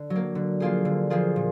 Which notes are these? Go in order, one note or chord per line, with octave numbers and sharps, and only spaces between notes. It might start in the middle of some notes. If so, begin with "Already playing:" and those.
Already playing: D3
F#3
A#3
D3
F3 A#3 F4 G#4
D3
F3 A#3 F4 G#4
A#2